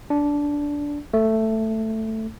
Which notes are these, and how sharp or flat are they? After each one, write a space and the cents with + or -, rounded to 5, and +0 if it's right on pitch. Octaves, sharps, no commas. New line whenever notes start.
D4 -15
A3 +5